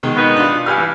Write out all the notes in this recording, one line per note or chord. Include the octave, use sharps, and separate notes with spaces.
B2 D#3 G#3
B3 D#4
D4 F4
G2 G#5 B5 F6
E3